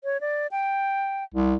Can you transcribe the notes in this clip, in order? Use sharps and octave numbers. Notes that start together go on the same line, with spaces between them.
C#5
D5
G5
C2